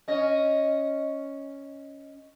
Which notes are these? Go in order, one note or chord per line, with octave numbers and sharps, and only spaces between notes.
C#4 D#5